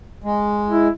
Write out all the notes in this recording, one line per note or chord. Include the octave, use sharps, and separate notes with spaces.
G#3
E4